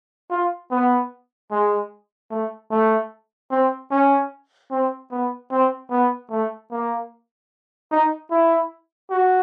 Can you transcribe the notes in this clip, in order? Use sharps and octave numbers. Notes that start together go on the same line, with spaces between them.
F4
B3
G#3
A3
A3
C4
C#4
C4
B3
C4
B3
A3
A#3
D#4
E4
F#4